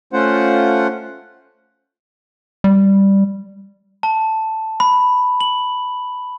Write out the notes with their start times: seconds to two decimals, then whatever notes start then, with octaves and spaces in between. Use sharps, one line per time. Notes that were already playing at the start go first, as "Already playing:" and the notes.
0.13 A3 C#4 F4 C5 F#5
2.64 G3
4.03 A5
4.80 B5
5.41 F#7